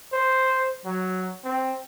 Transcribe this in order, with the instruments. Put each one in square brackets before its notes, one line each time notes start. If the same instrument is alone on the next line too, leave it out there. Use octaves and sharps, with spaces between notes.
[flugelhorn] C5
F#3
C4